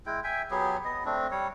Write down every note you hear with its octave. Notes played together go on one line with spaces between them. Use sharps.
G#3 E4 G5
E5 G5 G#5
F#3 B3 G4 G#4
B3 D#5
A3 C4 D4
G3 C#5